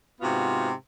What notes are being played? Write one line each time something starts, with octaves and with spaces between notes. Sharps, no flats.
G#2 C3 B3 F4 F#4